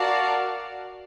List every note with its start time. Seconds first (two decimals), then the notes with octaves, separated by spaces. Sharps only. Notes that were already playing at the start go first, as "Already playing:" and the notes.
Already playing: F#4 A#4 D5 F5 A5